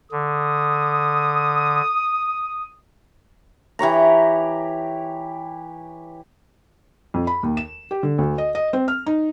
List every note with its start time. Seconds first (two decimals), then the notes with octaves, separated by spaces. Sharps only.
0.12 D3 D#6
3.79 E3 G4 C#5 A#5
7.14 F2
7.27 B5
7.43 D#2
7.57 E7
7.91 G4
8.03 D3
8.18 D2
8.38 D#5
8.55 D#5
8.73 C4
8.88 F6
9.06 D#4